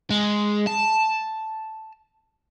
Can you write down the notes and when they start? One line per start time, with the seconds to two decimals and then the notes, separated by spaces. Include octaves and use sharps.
0.11 G#3
0.67 A5